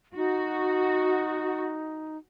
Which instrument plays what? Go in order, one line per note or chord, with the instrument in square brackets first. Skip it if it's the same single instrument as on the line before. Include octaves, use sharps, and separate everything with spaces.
[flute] D#4 [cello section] F#4